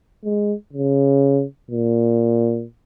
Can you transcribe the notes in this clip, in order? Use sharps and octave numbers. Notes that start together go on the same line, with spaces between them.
G#3
C#3
A#2